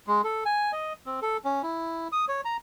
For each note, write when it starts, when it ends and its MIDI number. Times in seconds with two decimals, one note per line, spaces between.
0.07 0.22 56
0.24 0.44 69
0.46 0.72 80
0.72 0.93 75
1.06 1.20 60
1.22 1.37 69
1.45 1.62 61
1.63 2.08 64
2.12 2.25 87
2.28 2.41 73
2.45 2.57 82